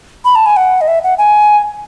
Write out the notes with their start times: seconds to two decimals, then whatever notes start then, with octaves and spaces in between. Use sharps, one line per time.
0.25 B5
0.35 A5
0.46 G#5
0.57 F#5
0.81 D#5
0.88 E5
1.04 F#5
1.18 G#5